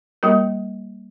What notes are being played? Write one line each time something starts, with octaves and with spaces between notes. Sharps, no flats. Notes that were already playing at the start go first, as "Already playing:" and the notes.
G3 A#3 A#4